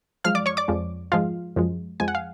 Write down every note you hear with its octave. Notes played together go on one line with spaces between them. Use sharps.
F#2 F3 G#3 F5 F6
D5 D6
C#5 C#6
D5 D6
F2 F3 G#3
G#2 F3 G#3 F4 F5
F#2 F3 G#3
F2 F3 G#3 G#5
F#5
F5